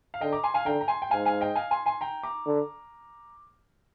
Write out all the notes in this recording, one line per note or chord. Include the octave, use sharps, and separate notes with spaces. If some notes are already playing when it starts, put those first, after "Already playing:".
F5
D3 D#5 G5
A#5 D6
G#5 C6
F5 G#5
D3 G5 A#5
A#5
G#5 C6
G5
G#2 F5 G#5
F5 G#5
D#5 G5
F5 G#5
G#5 C6
G#5 C6
G5 A#5
A#5 D6
D3